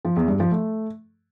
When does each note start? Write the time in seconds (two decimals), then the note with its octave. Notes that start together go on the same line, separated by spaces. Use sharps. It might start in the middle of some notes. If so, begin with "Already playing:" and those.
0.05 F3
0.16 E2
0.28 G2
0.40 F3
0.51 A3